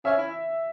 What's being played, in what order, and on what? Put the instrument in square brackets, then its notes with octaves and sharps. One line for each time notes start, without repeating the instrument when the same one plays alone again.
[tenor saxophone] C#4 [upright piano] E5
[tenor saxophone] E4